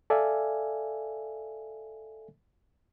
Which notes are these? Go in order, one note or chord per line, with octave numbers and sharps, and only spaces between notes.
A4 D5 E5 F5 G#5